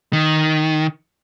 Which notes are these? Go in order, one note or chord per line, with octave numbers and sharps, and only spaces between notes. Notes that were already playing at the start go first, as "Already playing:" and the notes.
D#3